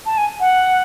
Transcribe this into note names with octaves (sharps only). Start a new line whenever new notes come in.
A5
G#5
F#5